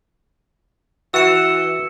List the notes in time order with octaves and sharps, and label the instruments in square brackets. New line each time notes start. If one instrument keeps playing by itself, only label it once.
[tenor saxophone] E3 [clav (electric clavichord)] F#4 [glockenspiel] E6 C#7 E7